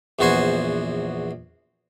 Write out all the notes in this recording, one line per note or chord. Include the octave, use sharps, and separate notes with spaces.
A#1 E2 B3 F#4 C5 G#5